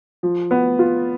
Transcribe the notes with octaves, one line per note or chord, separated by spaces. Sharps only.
F3
B3
F4